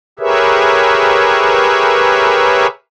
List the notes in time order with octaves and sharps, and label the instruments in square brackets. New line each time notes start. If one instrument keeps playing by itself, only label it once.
[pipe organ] G4 G#4 A#4 B4 C#5 E5